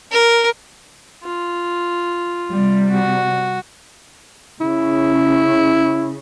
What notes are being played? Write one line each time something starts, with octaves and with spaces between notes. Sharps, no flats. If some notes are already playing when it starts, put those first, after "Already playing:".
A#4
F4
C3 G3
F#4
C#3 E4